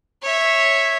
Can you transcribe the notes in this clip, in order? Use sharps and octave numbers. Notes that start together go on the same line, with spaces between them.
C#5 E5